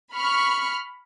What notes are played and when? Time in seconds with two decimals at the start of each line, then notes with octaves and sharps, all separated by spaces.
0.12 B5 C#6 F6